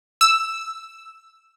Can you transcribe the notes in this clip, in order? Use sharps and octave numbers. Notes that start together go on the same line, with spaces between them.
E6